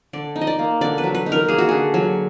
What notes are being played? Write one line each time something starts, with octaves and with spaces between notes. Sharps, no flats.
D3 D5
D#4
D#5
D5
A#3
D3 D5
B4
F#3
B4
D#4
A#4
A#3 G#4
F#4
D3 G#4
F#3